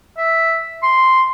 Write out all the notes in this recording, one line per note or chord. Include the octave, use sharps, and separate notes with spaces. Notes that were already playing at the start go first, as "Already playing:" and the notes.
E5
C6